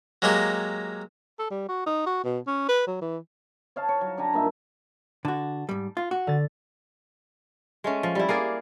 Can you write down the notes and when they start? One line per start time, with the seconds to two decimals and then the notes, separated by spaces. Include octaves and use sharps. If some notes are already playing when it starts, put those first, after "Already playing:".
0.22 F#3 G#3 A#3 G4
1.39 A4
1.50 G3
1.68 F#4
1.86 D#4
2.06 F#4
2.24 B2
2.47 C#4
2.69 B4
2.87 F#3
3.01 E3
3.76 C#5 F5 A5
3.89 C#5
4.01 F#3
4.17 D4 G4 G#5 A#5
4.33 G2 A#2 D#4 E5
5.25 D3 F#4 A5
5.69 G#2 G3
5.97 F4
6.11 F#4
6.27 D3 A6
7.84 G#3 A3 C#4
8.03 F3
8.15 G3 E4
8.29 A#3 G#4 A#4 D5